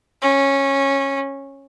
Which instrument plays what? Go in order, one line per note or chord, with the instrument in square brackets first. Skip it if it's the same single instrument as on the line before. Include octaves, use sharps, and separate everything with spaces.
[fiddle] C#4